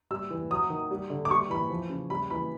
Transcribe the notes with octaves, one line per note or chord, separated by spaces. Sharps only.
G3 E6
E3
F#3 D#6
D#3
G3
D3
D6
G3 C#6
E3 B5
F3
C#3
G3 B5
E3 B5